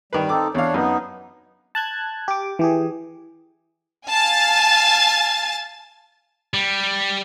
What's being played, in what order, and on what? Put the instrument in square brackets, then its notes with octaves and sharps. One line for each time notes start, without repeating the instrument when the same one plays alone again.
[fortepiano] D#3 B4 [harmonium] G3
[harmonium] C4 D#4 A4 [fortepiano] D6
[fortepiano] E2 F5 [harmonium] D4 C#5
[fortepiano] F#2 [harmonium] B3 D#4
[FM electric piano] A5 F#6 G#6
G4 D6
E3 G4 G#4
[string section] F5 G#5 A5 A6
[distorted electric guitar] G3